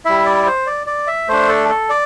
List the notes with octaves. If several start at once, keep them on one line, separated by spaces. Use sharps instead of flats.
G3 E4 E5
D5
C5
D5
D5
E5
A3 D4 C5
A4
A4
D5